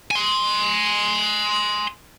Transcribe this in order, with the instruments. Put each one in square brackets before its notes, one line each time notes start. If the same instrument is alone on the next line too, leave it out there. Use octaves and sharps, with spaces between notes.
[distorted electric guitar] G#5 C6